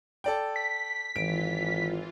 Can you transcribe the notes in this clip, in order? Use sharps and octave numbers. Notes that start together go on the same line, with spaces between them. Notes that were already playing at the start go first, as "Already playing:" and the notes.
A4 D5 G5
B6
G#1 E3 F4 D7